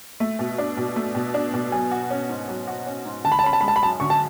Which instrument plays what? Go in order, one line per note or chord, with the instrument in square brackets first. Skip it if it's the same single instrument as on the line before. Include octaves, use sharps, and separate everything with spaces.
[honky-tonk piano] A3 [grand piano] E5
[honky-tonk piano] B2
D4
B2
A3
B2
D4
B2
[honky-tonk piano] F#3 [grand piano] G#5
[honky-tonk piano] F#4
C#4
G#2
F#3
F#4
C#4
G#2
[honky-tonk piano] D3 [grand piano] A5
[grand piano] B5
A5
[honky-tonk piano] C#4 [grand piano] B5
[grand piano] A5
[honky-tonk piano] G#3 [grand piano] B5
[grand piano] A5
B5
[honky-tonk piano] F#2 [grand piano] A5
[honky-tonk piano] D3 [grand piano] C#6
[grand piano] A5